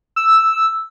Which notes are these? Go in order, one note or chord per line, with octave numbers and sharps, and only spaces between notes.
E6